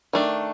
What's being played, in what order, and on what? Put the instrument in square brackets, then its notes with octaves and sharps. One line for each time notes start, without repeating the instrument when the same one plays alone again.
[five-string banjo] D#3 A3 D4